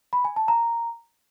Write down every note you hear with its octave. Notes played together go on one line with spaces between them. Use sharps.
B5
G#5
A5
A#5